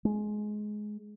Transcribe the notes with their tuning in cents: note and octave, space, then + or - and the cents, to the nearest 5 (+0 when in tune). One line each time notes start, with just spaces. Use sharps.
G#3 +15